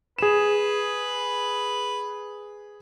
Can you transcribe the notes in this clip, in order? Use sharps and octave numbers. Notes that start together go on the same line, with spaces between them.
G#4 B4 E7